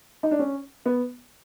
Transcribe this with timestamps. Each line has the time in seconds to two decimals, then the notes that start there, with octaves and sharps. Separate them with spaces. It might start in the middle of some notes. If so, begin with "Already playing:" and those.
0.23 D#4
0.31 D4
0.39 C#4
0.86 B3